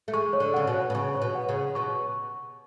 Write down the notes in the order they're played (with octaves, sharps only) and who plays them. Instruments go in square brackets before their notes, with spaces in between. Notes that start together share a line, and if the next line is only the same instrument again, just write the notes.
[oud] A3
[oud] G#3 [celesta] C#6
[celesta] C#5
[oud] D3
[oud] C#3 [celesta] F#5
[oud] B2
[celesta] C#5
[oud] B2
[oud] C#3 [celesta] C#6
[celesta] C#5
[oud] B2
[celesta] F#5
[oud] C#3
[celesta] C#5
[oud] B2 [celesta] C#6